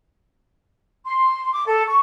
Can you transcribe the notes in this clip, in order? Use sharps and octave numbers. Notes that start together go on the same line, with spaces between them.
C6
D6
A4
C#6